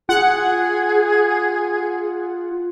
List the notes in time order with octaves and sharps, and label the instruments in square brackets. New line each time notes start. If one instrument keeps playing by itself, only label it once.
[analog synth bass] F4 [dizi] G#4 [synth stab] F#5